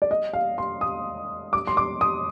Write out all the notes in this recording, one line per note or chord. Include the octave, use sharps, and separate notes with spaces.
D5
D#5
F5
C6
D#6
D6
C6
D6
D#6